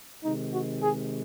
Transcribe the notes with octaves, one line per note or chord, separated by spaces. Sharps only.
C3 D#3 G#3 D#4
F#4
G#4